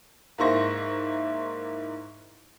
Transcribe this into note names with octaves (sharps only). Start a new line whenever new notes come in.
G#2 A#3 E4 C5 C#6 A#6